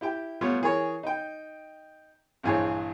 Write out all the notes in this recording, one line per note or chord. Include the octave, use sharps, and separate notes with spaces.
E4 G4 G5
G3 A3 B3 F4 C#5
E3 G#4 A#4 C#5
D#4 G5
A#1 G2 E3 G#4 C5 C#5